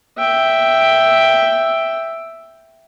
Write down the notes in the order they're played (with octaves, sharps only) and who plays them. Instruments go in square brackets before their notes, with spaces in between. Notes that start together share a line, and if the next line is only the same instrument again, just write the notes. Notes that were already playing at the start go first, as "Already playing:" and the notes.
[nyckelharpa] E5 G5